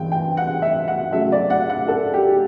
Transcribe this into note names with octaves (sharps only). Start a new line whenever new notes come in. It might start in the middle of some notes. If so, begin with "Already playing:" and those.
Already playing: G2 E3 B3 G5
G5
F#5
E5
F#5
C#3 F#3 A3 E5
D5
F#5
F#5
A4
G4